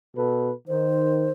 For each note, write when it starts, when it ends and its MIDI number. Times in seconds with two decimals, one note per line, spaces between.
0.16 0.51 47
0.16 0.51 69
0.16 0.51 71
0.68 1.30 51
0.68 1.32 72